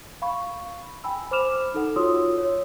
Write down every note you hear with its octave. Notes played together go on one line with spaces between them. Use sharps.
F5 B5 C#6
G5 G#5 B5 E6
C5 B5 D6 F6 E7 F7
D#4 A4 F#5
F4 F#4 C#5 C6 D#6 E6
C#5